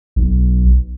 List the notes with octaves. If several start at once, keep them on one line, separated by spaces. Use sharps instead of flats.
B1